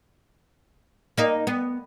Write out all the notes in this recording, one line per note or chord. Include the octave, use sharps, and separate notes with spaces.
A#3 D#4
B3